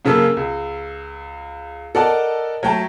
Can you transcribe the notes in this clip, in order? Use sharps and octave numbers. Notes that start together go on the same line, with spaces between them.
F#2 C#3 A#3 A4 E6
C#2
A4 A#4 D5 D#5 F#5 A5
F#3 A3 G5 A5